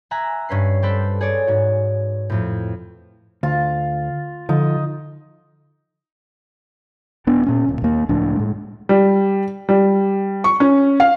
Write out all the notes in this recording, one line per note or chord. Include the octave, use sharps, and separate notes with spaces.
E5 G#5 A#5 F#6
G2 C#4 B4 C7
G3 G4 A4 B4 C5
G#4 C#5 D5
G#2 F#4
F2 A2
D2 F4
D3 F3 D#4
D#1 B3 D4
A#2 C#4
D#1 A#2
D#2 A#3
C#2 A2 F3 D4
A2 G#3
G3
G3
C#6
C#4
F5